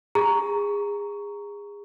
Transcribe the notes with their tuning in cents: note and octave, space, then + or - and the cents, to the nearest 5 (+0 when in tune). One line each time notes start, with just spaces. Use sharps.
G#4 -25 A#5 +0 C#6 +10